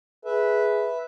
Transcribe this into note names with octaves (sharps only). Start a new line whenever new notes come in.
G#4 B4 E5